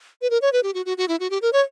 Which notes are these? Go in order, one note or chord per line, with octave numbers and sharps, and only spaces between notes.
B4
A#4
C#5
B4
G4
F#4
F#4
F#4
E4
F#4
G4
A#4
C#5